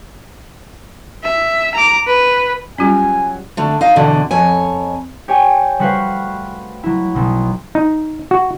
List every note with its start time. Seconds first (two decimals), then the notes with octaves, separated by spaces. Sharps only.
1.23 E5
1.75 A#5 D6
2.07 B4
2.78 F#3 G3 C#4 F4 G#5
3.57 D3 A3
3.81 D#4 D#5 F5
3.96 E2 B2 D3
4.31 F2 C#5 G#5
5.28 G4 C#5 D5 G5 G#5
5.80 G3 A3 F#4 B4 C5 F5
6.83 F#3 E4
7.15 B1 B2
7.75 D#4
8.31 F#4